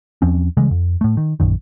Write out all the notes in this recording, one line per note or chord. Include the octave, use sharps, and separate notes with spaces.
E2 F3 C4 C#4
C#3 E3 G3 G#3
F2
A2 A3
D#3
A#1 F#2 D#3